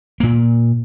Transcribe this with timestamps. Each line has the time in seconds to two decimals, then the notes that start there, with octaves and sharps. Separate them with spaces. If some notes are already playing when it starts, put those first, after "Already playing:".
0.20 A#2 A#3